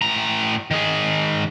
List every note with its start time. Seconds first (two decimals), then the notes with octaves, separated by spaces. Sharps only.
0.02 A2 A#5
0.71 D#3 G#4